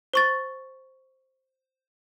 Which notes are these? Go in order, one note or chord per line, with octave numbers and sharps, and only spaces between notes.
C5 C#6 A6